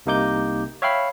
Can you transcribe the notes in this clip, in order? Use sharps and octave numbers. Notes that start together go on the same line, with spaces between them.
C2 C3 A#3 D#4 D6 G6
C#5 E5 F5 G5 B5 C7